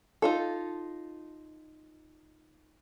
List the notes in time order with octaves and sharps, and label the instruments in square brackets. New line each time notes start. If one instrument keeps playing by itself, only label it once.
[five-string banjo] D#4 F4 A4